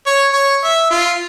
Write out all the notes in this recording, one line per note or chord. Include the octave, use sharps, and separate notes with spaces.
C#5
C#5
E5
F4